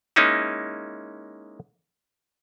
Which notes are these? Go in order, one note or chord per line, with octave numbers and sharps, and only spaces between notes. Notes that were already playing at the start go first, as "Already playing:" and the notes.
G#3 A#3 C#4 D#4 E4